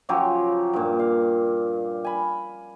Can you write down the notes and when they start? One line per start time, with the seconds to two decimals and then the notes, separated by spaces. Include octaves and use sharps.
0.09 C#3 F3 F#3 G4
0.74 G2 A#2
0.99 F5
2.04 G#5 B5